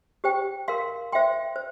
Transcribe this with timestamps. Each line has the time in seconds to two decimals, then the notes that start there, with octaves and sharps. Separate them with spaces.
0.24 G4 C5 G5
0.68 A#4 F5 C6
1.12 C5 E5 G5 C6
1.56 C5